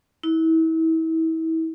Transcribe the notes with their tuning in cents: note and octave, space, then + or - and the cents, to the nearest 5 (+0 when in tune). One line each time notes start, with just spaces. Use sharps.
E4 -35